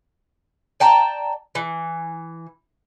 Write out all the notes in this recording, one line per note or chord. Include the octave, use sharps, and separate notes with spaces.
D5 G5 A5 A#5
E3